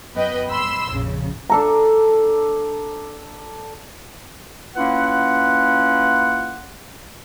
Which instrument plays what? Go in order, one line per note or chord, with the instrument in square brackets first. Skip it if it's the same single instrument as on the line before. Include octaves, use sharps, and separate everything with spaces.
[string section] F#2 B3 B4 D#5 G5
B5 C6 E6
A#1 F2 C#3
[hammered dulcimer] D4 A4 A#5
[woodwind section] A#3 C#4 E4 F4 B4 F#5